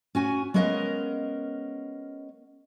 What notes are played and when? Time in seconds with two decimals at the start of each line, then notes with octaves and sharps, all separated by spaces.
0.15 C#4 F#4 G#5
0.54 G#3 B3 C#4 A#4 D#5 F5